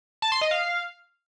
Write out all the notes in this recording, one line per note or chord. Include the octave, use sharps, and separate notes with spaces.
A5
C6
D#5
F5